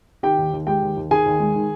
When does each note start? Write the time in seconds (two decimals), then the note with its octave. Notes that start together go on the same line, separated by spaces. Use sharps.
0.23 D#3 G4 G5
0.38 D#2
0.53 D#2
0.67 G#3 G4 G5
0.82 D#2
0.97 D#2
1.11 D#3 G#4 G#5
1.26 D#2
1.40 G#3
1.55 D#3